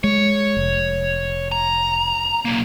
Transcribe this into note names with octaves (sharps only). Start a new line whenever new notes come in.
G#3 C#5
F1
A#5
B1 A#3